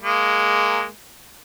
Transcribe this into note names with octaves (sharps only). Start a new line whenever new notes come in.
G#3 A#3